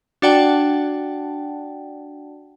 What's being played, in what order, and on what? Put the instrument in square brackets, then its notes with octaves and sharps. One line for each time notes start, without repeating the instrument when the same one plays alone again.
[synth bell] D4 F#4 D5 F#5 G5 A5